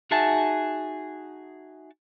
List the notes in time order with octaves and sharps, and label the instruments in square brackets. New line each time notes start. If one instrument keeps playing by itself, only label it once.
[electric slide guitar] D#4 F#4 G#4 E5 A5